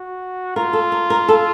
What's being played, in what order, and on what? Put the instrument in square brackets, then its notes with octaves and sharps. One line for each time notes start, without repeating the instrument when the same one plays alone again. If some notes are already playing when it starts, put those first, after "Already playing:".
Already playing: [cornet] F#4
[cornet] F4 [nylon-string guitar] A#4
[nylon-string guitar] A4
A#4
A#4
A4